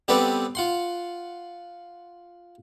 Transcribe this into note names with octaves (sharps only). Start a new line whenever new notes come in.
G3 B3 C4 A4 B4 D5
F4 F#5 C6